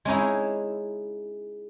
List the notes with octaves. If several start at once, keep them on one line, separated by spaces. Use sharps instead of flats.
G#3 C#4 D#4 E4